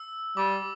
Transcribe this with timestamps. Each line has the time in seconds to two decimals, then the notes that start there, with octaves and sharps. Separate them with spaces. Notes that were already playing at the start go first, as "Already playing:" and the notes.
Already playing: E6
0.37 G3 D6